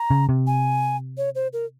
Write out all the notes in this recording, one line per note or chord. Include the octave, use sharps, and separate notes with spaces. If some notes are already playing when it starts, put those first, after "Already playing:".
Already playing: A#5
C#3
C3
G#5
C#5
C5
A#4